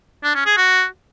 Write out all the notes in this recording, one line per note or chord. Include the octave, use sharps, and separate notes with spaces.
D4
C#4
G#4
F#4